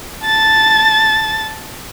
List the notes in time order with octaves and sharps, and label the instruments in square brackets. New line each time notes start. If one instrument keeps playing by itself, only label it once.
[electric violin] A5 A6